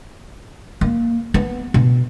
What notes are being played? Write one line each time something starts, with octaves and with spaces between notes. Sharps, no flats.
A#3
B3
B2